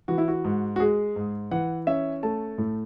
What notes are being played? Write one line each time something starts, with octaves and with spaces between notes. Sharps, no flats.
E3 F#4
E4
F#4
G#2
F#4
G#3 G#4
G#2
E3 F#5
C#4 E5
A3 A5
A2